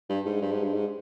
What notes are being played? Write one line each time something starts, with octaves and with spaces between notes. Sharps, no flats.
G2
G#2
G2
G#2
G2
G#2